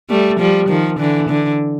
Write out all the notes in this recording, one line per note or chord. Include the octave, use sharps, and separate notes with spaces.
G3 A3
F3 G3
D#3 F3
D3 E3
D3